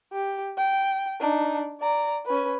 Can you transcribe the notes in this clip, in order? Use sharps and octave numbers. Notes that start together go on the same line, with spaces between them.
G4
G5
D4 D#4
D5 A#5
C#4 B4